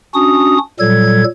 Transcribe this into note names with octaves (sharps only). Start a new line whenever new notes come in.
C#4 D4 F#4 D#6
A#2 F#3 G3 A4 G#6